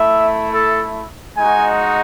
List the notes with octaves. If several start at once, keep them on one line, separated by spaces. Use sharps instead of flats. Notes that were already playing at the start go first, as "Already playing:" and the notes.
Already playing: A3 E4 E5
A4
G#3 D#4 F#4 G#5